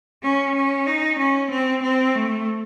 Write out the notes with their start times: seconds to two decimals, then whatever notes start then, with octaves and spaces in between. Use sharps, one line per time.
0.23 C#4
0.55 C#4
0.87 D#4
1.19 C#4
1.50 C4
1.83 C4
2.15 A3